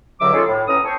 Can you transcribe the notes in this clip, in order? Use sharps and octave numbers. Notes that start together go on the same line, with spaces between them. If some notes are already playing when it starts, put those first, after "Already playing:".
C#2 G2 D3 F#3 E5 D6
C#4 D#4 F4 G#4 A4
A2
A2 B3 C#4 C#5 A#5 D#6
C4 A4 C5 C#5